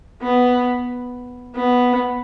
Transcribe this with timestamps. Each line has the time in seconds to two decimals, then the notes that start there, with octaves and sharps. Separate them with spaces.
0.22 B3
1.55 B3